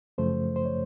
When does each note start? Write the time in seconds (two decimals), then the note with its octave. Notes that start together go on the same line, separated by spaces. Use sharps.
0.18 F#2 C#3 F3 A3 C5
0.56 C5
0.66 C#5